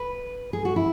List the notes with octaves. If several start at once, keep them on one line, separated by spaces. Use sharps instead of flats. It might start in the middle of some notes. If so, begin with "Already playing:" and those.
Already playing: B4
G#4
F#4
E4